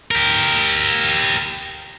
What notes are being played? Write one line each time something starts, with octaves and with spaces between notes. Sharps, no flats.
G4 A#4